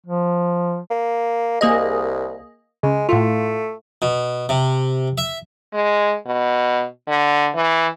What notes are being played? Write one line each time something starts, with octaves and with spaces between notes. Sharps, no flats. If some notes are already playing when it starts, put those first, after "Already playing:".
F3
A#3
C2 A#3 G#4 D#5
C#3 G#3
A2 A3 F4
B2
C3
E5
G#3
B2
D3
E3